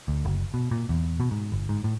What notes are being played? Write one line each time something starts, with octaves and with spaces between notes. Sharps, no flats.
D2
F#1
B2
A#2
E2
B2
G#2
G1
G#2
A2